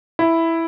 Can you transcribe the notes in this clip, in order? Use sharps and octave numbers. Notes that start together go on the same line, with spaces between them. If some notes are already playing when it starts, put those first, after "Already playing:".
E4